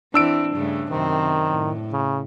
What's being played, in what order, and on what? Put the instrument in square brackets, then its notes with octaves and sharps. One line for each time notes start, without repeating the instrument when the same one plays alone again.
[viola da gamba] E3 C4 [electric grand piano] D4 E6 D7
[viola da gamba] G2 C#3 A3
[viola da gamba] F#2 C3 C4 [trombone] D#3
[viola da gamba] A2
[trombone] C#3